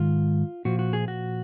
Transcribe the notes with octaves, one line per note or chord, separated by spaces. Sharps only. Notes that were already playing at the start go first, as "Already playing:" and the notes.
Already playing: G#2 D#3 F4
A#2 F3 F#4
F#4
G#4
F#4